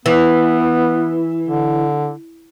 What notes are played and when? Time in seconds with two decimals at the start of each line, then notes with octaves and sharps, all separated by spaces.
0.06 E3 B3
1.49 D3